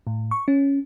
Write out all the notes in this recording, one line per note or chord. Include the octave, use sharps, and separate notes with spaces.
A2
C#6
C#4